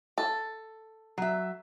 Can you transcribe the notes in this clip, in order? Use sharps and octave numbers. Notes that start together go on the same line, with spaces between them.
A4
F#3 E5